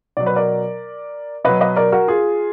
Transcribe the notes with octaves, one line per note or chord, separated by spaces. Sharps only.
B2 F#3 D5
B4
A#4 D5
B2 F#3 B4 D#5
B4 D#5
A#4 D5
F#4 A#4
F4 G#4